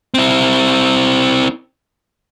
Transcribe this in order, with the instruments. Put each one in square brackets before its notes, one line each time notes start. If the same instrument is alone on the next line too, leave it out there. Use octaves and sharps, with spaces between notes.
[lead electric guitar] C4 E4